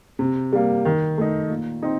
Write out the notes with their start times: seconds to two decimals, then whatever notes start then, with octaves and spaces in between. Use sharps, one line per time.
0.19 C3
0.52 G3 A#3
0.85 D#3
1.18 A3 D#4
1.50 A#2
1.82 C4 D#4